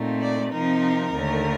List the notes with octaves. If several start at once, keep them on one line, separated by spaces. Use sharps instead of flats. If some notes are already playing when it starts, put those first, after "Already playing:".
Already playing: A#2 A3 C4 D#4
D5
C3 F3 C4 D#4 A#4
D#2 D3 A3